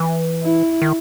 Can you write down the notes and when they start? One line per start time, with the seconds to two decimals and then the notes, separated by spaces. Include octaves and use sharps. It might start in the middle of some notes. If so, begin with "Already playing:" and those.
Already playing: E3
0.43 E4
0.82 D#3